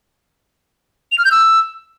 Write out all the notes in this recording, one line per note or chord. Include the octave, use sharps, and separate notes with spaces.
F7
F6
G6
E6